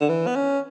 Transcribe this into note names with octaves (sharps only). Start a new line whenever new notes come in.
D3
E3
B3
C#4